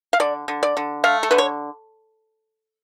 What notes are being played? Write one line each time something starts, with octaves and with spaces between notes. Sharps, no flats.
F5
D3 D5
D3
D5
D3
A3 F5
A4
D3 B4
C#5